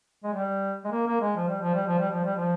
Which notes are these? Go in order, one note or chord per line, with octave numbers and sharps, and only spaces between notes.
G#3
G3
G#3
A#3
A#3
G#3
F3
G3
F3
G3
F3
G3
F3
G3
F3